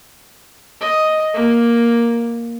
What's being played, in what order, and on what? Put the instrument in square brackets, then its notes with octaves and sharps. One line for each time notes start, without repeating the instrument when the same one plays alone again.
[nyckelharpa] D#5
A#3